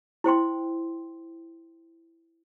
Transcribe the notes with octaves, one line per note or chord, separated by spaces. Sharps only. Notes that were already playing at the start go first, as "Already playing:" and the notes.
E4 C5 G5 C6